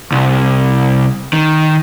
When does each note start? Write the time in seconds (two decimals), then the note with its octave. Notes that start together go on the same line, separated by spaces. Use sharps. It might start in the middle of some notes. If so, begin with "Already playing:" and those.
0.12 C2
1.33 D#3